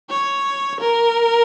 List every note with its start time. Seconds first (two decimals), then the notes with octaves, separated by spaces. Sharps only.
0.10 C#5
0.80 A#4